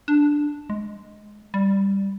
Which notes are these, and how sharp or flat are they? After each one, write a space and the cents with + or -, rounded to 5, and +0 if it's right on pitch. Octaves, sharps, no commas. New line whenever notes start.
D4 +0
G#3 +5
G3 +5